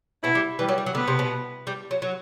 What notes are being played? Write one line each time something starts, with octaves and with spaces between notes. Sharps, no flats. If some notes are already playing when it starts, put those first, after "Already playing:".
B2 B3 E4
G3
E3 G3
F#3
G3
F#3
D3 B3
C3
B2
G3
F#3
F#3